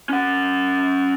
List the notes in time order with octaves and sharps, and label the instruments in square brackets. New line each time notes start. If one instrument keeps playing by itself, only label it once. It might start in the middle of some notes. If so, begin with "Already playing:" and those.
[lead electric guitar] C#4 F#5